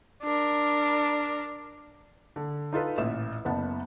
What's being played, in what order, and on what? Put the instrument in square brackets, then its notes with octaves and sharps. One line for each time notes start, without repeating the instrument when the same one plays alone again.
[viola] D4 A#4
[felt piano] D3
D#4 F4 A4 B4
A1 A#2 E5 E7
F#1 B3 F#5 A5